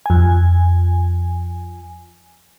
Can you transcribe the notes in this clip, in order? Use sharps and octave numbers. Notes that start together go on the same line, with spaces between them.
F2 G#5